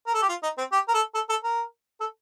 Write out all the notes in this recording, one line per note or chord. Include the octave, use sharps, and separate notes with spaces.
A#4
A4
G4
F4
D#4
C4
G4
A#4
A4
A4
A4
A#4
A4